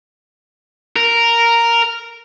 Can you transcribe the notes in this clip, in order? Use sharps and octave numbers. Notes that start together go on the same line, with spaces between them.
A#4